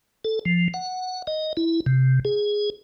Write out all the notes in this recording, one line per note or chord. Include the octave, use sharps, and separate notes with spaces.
A4
F3
F#5
D#5
E4
C3
G#4